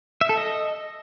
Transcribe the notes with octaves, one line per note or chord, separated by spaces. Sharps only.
E5
A4
D#5